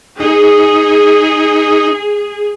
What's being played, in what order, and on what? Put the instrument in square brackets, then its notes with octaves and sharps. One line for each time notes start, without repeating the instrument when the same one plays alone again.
[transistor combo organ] D#4 [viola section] G#4